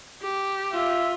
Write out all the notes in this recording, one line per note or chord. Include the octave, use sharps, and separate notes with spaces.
G4
F4 E5